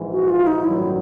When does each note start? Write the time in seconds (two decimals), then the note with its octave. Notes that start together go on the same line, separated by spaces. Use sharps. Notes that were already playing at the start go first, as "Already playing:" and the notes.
Already playing: A#1 G#2 E3
0.12 F#4
0.29 F4
0.47 D#4
0.64 A1 G2 D#3 F#3 E4